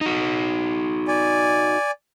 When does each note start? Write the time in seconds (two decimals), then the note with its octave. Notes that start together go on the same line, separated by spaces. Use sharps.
0.01 D#4 F#4
1.08 D5 G#5